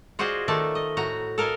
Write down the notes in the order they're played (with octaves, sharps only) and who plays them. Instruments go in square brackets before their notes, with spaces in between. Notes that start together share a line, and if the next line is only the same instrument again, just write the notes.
[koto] F4 F#4 G#4 C5 D5 D#5
D#3 A3 F4 A4 D5 A5
D#5
A2 F#4 A#5
A4 A#4 D#5 F5 G#5